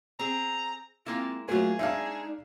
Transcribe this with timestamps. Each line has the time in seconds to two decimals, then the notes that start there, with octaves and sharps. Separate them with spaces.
0.19 C4 G#4 A#5
1.06 G#3 A#3 C4 E4 F4
1.49 F#3 A3 A#3 F4 G#4 C5
1.79 G#3 D4 D#4 E5 F5